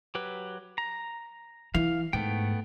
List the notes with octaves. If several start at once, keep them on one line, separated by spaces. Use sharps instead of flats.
F#3 G4 B4
A#5
E3 F5
G#2 A3 B3 G5